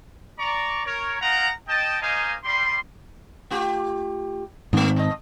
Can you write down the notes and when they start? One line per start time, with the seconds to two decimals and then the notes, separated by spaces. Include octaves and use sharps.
0.39 D5 A#5 C#6
0.85 A#4 C#5
1.21 D#4 F4 A#4 F#5 A#5
1.68 D#5 G5 A5
2.01 A#3 D#4 C5 D#5 F5 G#5
2.44 G3 C6
3.50 A3 F4 G4
4.73 G#2 D#3 A3 A#3 C4
4.96 B2 D#5